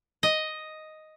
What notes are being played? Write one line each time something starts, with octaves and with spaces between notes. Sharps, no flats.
D#5